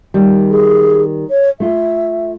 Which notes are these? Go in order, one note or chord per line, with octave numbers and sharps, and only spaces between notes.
D#3 G3
G#4
C#5
A3 F4 E5